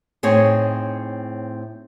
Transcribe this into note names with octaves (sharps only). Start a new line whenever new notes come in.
A2 C4 D#4 G#4 C#5